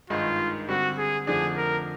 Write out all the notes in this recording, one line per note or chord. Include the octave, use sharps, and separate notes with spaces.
G#1 G2 D#3 G#3 F4
D3 G3 C4 F#4
G#4
F2 D3 F3 A3 D4 G#4
A#4